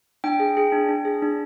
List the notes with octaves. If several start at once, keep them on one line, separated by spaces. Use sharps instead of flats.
D4 G5
G#4
G#4
D4
D4
G#4
D4